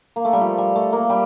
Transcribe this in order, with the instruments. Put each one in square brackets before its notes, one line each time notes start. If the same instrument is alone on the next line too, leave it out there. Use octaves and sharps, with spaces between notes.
[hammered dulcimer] A#3
A3
G3
F3
G3
A3
A#3
G3